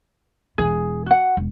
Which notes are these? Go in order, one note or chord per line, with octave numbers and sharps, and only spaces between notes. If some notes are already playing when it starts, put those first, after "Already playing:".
E1 E3 G#4
F#4 F#5
E1